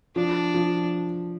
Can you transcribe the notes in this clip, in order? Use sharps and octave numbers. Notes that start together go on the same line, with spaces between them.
F3 D4
F3